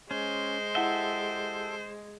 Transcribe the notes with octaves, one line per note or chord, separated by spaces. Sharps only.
G#3 C#4 C5
E4 G4 A4 E5 F#5 G7